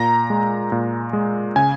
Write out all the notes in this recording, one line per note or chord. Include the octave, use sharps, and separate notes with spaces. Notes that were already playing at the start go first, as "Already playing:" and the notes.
Already playing: A#2 A#5
G#3
A#2
G#3
C#3 G#5